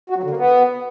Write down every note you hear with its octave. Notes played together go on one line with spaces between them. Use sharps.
F#4
F#3
D3
A#3
B3